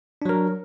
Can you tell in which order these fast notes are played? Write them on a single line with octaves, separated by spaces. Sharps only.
D4 F#3 A#4